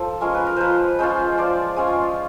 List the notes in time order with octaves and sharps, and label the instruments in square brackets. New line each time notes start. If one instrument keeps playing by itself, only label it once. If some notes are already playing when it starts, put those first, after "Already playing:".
Already playing: [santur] F3 A4
G#3 C#4 F4 A#4
B4
A#4
F3 B4 C5
G#3 C#4 F4 C5
F3 D5
G#3 C#4 F4